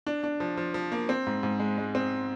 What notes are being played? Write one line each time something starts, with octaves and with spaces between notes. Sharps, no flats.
D4
D4
F3
F3
F3
A#3
C4
G#2
G#2
G#3
G#3
C4